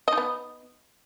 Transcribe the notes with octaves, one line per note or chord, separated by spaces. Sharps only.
B3 D#4 D#5